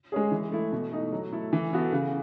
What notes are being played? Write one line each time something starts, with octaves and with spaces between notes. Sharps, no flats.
G#3 C#4 G#4
E3
A3 E4
B2
A3 D#4
F#3
A3 E4 A4
E3
B3 F#4 A4
C#3